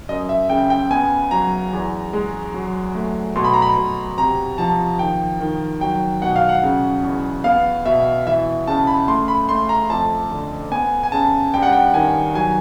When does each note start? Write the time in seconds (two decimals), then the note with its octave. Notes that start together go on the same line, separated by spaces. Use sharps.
0.09 F#2 D#5
0.29 E5
0.50 C#3 G5
0.70 G5
0.90 B3 G#5
1.31 F#3 A#5
1.73 E2
2.13 G#3
2.54 F#3
2.95 A3
3.36 B2 C6
3.44 B5
3.54 A#5
3.62 B5
3.77 B2
4.17 C3 A#5
4.58 F3 A5
4.99 D#3 G5
5.40 D#3
5.81 F#3 G5
6.22 B2 F#5
6.36 F5
6.49 F#5
6.63 C#3
7.03 E2
7.44 B3 F5
7.86 B2 E5
8.26 E3 E5
8.67 C#3 A5
8.87 B5
9.08 A3 C6
9.28 B5
9.49 A3 C6
9.69 A#5
9.90 F2 A5
10.30 D3
10.71 B3 G#5
11.03 G#5
11.12 C#3 A5
11.53 G2 G5
11.63 F#5
11.73 G5
11.94 D#3 G#5
12.34 F#3 G#5